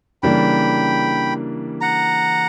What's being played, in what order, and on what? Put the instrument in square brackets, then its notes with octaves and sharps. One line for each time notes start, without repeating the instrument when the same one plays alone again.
[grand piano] C#3 E3 G3 A#3 D4 [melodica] G5 B5
[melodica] F#5 A#5